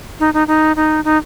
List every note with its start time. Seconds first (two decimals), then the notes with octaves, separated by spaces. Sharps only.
0.20 D#4
0.34 D#4
0.47 D#4
0.76 D#4
1.05 D#4